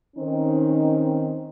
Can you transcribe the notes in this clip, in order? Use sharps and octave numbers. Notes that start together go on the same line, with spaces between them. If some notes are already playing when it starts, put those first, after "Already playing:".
D#3 C4 C#4 D#4